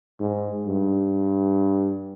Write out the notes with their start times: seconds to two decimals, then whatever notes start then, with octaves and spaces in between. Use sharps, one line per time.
0.20 G#2
0.66 G2